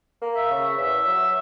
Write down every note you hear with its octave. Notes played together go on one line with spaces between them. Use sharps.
A#3
E5
C#3
E2 E5
F#3